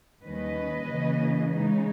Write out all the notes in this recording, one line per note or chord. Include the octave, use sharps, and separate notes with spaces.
D#2 D#3 G3 C#4 B4 D#5
C#3 E3 A#3 C#4
C#3 G#3 D#4